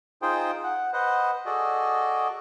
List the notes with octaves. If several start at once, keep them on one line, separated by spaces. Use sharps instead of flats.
D#4 F4 G#4 C5 G5
F#5
B4 C5 D#5 F#5
F#4 G#4 A4 D5 D#5